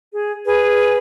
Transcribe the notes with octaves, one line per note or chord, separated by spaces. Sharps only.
G#4
G#4 B4